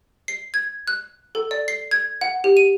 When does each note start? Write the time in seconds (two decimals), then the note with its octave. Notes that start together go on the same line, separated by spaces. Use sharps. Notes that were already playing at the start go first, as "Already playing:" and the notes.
0.28 C7
0.54 G#6
0.88 F#6
1.35 A4
1.51 D5
1.68 C7
1.91 G#6
2.21 F#5
2.44 G4
2.57 D#7